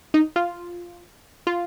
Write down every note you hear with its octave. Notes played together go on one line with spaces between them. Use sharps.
D#4
F4
F4